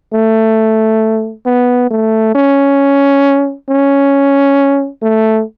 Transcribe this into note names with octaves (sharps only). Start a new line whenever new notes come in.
A3
B3
A3
C#4
C#4
A3